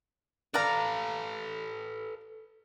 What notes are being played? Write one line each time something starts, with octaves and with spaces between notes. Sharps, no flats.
A4 B4 D5 F5 A#5